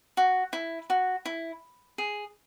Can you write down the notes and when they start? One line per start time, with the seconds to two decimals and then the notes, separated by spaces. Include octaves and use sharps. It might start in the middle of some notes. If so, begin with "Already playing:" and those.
0.17 F#4
0.53 E4
0.90 F#4
1.26 E4
1.98 G#4